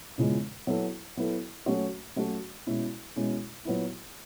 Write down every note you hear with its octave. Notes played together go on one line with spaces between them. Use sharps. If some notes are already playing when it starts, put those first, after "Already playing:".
E2 C#3 F3 G#3
F#3 B3 E4 A4
F#3 B3 E4 A4
F#3 A3 C#4 F#4
F#3 A3 C#4 F#4
B2 G#3 C#4 E4
B2 G#3 C#4 E4
A#2 F#3 B3 E4